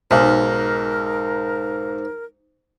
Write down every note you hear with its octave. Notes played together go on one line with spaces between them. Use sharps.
B1 G#2 A#4